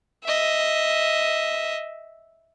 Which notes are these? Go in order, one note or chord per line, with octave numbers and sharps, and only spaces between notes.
D#5 E5